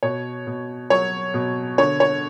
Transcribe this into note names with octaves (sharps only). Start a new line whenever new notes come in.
B2 C#5
B2
F#3 C#5
B2
D3 C#5
C#5